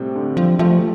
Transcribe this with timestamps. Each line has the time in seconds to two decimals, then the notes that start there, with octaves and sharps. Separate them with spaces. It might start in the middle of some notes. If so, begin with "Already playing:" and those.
Already playing: A2 C3 G3 C4
0.15 D3
0.37 F3 G3
0.59 F3 A3